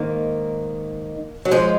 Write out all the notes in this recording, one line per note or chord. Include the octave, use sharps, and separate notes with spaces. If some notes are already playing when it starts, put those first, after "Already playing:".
Already playing: G#2 D#3 A#3
F#3
G#2 F3 G#3